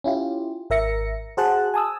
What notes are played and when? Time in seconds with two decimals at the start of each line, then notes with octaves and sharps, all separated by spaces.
0.04 C#4 E4 F4 G4
0.70 G#1 A#4 E5 A#6 C#7
1.37 F#4 G#4 C5 F#5 A5 F#6
1.74 G#5 A5 D#6 E6